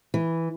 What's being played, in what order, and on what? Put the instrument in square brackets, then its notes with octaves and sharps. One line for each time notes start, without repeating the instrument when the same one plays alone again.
[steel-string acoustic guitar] E3